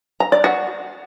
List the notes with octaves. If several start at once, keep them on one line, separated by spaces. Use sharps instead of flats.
A#5
D5
F#4